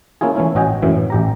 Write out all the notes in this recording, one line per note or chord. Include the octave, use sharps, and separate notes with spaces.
A#3 C#4 E4 F4 G#4
E3 A3 C#4 E4
A1 C#4 F#4 D#5 G5 G#5
F#2 A2 E3
A1 G4 A#5